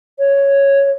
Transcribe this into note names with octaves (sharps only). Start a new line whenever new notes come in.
C#5